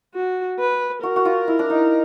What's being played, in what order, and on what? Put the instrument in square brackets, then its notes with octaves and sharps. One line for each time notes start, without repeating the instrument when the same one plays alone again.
[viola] F#4
B4
[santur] F#4 [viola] A#4
[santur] F#4
F4
E4
D4
D#4